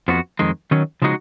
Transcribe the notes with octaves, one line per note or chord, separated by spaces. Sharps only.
F2 F3 B3 F#4
F2 D#3 G#3
D#3 F#3 C#4
C#3 F3 G#3 D#4 F#4